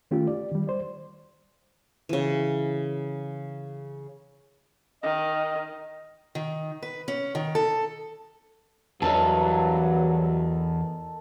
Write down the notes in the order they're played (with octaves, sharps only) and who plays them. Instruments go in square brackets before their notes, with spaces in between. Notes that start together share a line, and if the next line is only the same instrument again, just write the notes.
[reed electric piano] D#3 A3 C#4 F4 G4
D5
D#3 G3
C5 D5
[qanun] C#3 E3
[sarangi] D#3 [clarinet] D#5
[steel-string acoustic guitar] D#3
B4
C#4
D#3
A4
[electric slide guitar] E2 E3 [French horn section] G2 F#3 [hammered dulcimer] A4 A#4 D#5